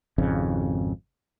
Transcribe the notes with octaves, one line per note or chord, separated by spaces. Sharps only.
G#1 F2 C#3